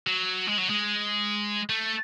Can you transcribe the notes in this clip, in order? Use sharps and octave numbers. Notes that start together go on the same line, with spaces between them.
F#3
G#3
F#3
G#3
A3